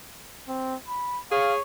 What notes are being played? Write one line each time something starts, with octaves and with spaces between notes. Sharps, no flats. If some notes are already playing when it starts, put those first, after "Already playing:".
C4
B5
G#4 C#5 F5